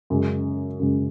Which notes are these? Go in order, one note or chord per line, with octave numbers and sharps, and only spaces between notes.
F#2 C#3 G#3
F#2 C#3 G#3